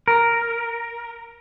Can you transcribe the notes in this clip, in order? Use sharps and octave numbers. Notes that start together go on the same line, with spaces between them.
A#4